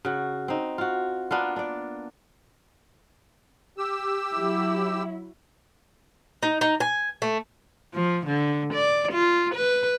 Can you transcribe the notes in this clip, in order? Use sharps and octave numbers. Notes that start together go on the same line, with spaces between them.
C#3 F#4
C4 D#4
F4 F#4
A#3 B3 D4 F4
D4 D5
G4 E6
F#3 E4
D#4
D#4
G#5
A3
F3
D3
D5
F4
B4